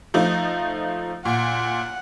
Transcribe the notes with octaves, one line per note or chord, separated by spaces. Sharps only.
F3 A3 D#4
A#2 F#5